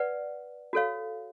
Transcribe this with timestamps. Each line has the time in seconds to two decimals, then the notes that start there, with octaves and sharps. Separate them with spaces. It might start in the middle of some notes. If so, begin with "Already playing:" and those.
Already playing: B4 D5 F#5
0.73 F#4 A4 C#5 F5